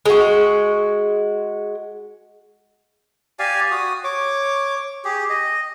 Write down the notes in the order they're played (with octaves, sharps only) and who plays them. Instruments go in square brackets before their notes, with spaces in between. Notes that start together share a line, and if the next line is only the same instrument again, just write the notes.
[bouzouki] G#3 F#4
[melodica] G4 D5 F5 G#5
F#4 D#6
C#5 D6
G4 G#4
D#5